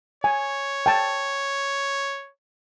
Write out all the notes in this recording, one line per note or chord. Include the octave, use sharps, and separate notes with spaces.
C#5 G#5
G5 A5